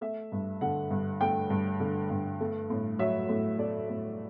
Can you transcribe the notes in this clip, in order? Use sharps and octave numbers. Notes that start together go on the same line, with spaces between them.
A3 E5
G2
D3 F#5
G2
A3 G5
G2
D3
G2
A3
A2
F#3 E5
A2
A3 D5
A2